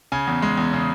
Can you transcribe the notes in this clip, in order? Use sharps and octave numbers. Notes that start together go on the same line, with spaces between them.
C#3 G#5
E2
G#3
E2
C#3